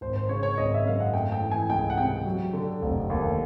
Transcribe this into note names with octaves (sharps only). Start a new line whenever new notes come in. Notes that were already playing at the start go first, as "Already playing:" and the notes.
G#1 C5
C5
C#3 C#5
C#5
G#1 D#5
E5
F#2 F5
F#5
A3 G5
G5
E3
G#5
C#2 G5
F#5
C3 G5
F#3
D3
F1
D#2